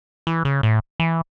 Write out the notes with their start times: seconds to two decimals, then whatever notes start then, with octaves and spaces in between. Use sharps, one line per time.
0.27 E3
0.45 C#3
0.63 A2
1.00 E3